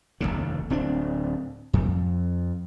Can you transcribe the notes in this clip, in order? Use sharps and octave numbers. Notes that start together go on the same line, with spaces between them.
F1 A#1 D#2 C#3
D1 C4 D4
F2